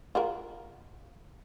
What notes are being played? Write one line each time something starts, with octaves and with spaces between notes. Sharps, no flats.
F4 F#4 A#4